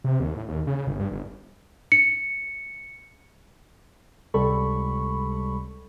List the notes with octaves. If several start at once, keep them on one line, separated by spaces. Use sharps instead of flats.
C3
D#2
A2
D#2
C#3
G1
G2
G1
C#7
C#2 C3 G3 A4 B5 C#6